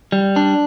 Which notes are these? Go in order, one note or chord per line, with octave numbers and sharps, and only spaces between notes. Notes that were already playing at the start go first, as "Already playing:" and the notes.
G3
D4